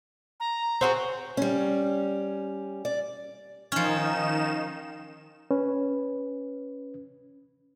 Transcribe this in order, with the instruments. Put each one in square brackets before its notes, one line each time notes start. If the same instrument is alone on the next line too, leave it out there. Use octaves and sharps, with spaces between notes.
[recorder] A#5
[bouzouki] C4 F#4 G#4
[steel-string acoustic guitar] G3 C#4
D5
[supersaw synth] D#3 D#4 E7 [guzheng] F3 C#4
[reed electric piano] C#4 B4